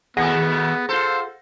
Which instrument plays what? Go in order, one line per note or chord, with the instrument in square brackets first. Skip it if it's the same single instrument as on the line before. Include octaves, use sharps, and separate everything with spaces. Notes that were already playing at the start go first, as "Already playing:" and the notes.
[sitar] D#2 B2 A3 [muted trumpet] B3 [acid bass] G#4 [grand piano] F#5 A#6
[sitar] F4 A4 [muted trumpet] C5